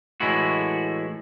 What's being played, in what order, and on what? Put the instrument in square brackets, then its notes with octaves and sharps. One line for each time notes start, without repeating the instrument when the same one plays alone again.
[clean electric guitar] A2 E3 G#3 A3 E4 F#4